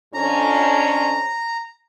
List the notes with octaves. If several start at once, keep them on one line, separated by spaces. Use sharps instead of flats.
F2 C#4 D4 A#5